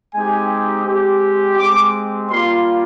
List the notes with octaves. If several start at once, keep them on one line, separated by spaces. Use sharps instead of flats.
G#3 C4 D#4 G4 G#5
G#3 C4 G4
G#3 C4 G4 D6
G3 A#3 F4 C6